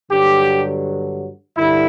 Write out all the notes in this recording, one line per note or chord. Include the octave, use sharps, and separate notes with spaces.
G2 D3 F#3 G4
G2 D3 E4